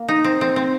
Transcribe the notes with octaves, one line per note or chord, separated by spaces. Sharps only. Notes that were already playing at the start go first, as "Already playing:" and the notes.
Already playing: A#3
D#4
C4
C4
C4